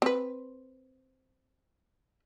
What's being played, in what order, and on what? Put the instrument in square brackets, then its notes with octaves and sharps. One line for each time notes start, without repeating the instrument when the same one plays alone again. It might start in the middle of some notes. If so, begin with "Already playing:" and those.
[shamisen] C4 B4